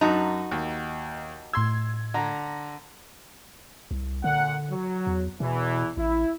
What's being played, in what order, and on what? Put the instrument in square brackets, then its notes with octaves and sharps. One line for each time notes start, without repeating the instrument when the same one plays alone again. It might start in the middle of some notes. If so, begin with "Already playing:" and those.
[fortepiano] F#2 A5 [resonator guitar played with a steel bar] D#4 F#4
[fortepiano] D#2
[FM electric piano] A2 G#6 [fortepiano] C6 E6
[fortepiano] D3 A#5
[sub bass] C2
[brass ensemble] A#2 F#5 [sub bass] D3
[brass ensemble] F#3
[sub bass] E2
[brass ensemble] E2 E3 [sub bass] B2
[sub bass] A1 [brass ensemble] E4